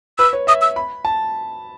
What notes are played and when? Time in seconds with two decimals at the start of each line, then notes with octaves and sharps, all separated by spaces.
0.18 B4 E6
0.33 C#5
0.47 E5 D#6
0.61 E6
0.76 B5
1.05 A5